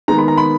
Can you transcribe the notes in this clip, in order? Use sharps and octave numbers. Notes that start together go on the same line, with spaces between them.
D#3 G#3 B3 A#5
B5
A#5
B5